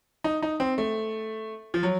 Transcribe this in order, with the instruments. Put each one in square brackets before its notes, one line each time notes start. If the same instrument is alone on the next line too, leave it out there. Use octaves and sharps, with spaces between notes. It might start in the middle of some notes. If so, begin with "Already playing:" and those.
[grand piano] D#4
D#4
C4
A3
F3
F#3